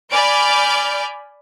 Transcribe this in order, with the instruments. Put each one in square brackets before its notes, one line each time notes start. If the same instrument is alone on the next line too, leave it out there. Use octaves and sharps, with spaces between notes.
[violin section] D5 G#5 B5 F6 G6 D7